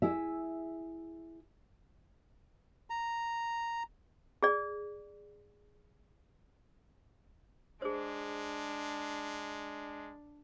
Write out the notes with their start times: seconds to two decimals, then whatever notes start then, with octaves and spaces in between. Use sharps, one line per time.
0.02 E4 G#4 E5
2.90 A#5
4.43 G#4 D5
7.82 G#3 D4 G#4 C5